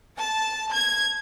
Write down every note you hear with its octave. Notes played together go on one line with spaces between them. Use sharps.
A5
G#6